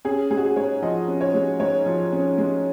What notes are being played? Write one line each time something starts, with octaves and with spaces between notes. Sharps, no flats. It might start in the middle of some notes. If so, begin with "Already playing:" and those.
C#4 G#4
G#3 G#4
F#4
G#4
G#2 C#5
F3 D#5
C#4
C#5
G#3
G#2 C#5
F3
C#4
G#3